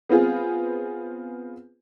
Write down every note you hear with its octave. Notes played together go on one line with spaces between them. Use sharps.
B3 C4 F4 G#4